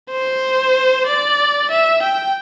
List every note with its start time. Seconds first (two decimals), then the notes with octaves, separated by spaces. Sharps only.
0.11 C5
1.07 D5
1.70 E5
2.02 G5